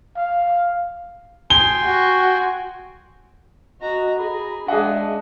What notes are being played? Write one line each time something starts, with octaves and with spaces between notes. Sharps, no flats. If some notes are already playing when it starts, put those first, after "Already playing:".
F5
G5 G#5 C6 G7
F#4
F#4 D#5 A#5
G#4 A#5 B5
G#3 D4 G#4 D#5 E5 F#5 A5